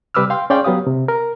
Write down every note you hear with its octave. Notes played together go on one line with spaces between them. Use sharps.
C3 G3 B4 D6 E6 F6
F5 G5 C6
C#4 G#4 D5 F5 G5 C6
F#3 B3 G4 F5 D#6
C3
A#4